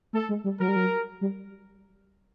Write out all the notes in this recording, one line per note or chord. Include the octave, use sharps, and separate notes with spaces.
A3 A4
G#3
G3
F#3 A#4
G3
F#3
G3